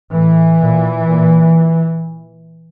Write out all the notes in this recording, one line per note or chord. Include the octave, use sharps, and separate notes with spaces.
A2 E3
A#2
A#2